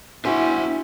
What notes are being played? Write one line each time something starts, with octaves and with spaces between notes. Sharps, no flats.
D4 E4 F#4 C5 G#5